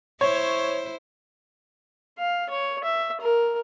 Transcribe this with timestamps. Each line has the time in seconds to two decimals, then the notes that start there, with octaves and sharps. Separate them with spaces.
0.21 E4 C5 C#5
2.18 F5
2.50 C#5
2.84 E5
3.21 A#4